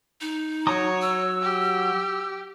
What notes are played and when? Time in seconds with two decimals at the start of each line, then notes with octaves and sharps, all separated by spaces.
0.21 D#4
0.67 F#3 C#5 A#5 D#6
1.02 E6
1.42 G4